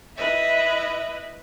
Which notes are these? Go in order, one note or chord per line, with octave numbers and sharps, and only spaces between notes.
E4 B4 D#5 E5